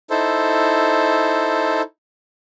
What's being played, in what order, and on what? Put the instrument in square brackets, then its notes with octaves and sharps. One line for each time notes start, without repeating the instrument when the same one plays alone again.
[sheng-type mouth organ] D#4 E4 A4 C5